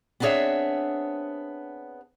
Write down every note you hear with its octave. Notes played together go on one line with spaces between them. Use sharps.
B3 C4 D4 G#4 C#5 E5